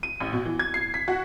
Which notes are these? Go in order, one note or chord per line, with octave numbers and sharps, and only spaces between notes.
D#7
A1
B2
E3
G#6
C7
B6
F#4